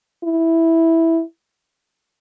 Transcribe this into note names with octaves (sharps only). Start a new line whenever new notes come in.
E4